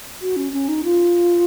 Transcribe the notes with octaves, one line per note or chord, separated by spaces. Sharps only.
F#4
C#4
C#4
D#4
F4